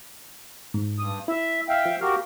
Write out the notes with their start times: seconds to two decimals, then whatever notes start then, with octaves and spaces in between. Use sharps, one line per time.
0.74 G#2
0.99 G2 D#6
1.28 E4 E5
1.69 E5 F5 G5
1.85 F3
2.01 F#4 G4 A#4 F5